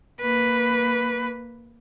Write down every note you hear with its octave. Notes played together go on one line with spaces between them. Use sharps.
A#3 B4